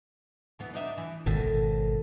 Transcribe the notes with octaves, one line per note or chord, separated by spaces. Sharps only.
D2 E3 B3
D4 D#4 E5
E3
G#1 B2 D#3 A4